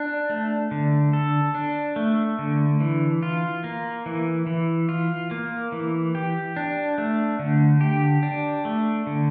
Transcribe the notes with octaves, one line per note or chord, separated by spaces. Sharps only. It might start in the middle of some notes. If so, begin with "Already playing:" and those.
Already playing: D4
A3
D3
A4
D4
A3
D3
E3
F4
A#3
E3
E3
F4
A#3
E3
G4
D4
A3
D3
G4
D4
A3
D3